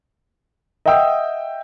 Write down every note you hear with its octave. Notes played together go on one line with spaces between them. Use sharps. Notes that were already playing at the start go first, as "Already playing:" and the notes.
D#5 E5 F#5 G5 D#6 E6